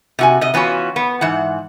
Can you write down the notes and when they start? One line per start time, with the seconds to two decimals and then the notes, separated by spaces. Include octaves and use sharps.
0.19 C3 F#4 G#5
0.41 C3 D#5
0.54 E3 B3 C#4 F4 F#4
0.96 B3
1.21 G#2 E3 F#5